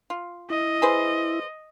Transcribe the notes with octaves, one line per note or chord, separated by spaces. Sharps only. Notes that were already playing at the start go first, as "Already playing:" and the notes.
F4
E4 D#5
G#4 B4 C5